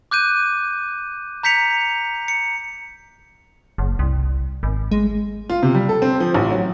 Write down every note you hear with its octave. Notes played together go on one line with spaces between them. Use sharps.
D6 F#6 G6 D#7
A#5 G6 B6 C#7 F7
C#7
F#1
C2
G#1
G#3
F4
C3
G3
A4
C4
F3
A1
F#3